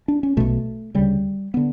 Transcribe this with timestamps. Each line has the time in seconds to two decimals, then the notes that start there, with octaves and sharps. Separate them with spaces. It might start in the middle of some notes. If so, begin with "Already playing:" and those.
0.08 D4
0.23 C#4
0.37 B1 B2 A3
0.95 D2 C#3 G3
1.54 D3 B3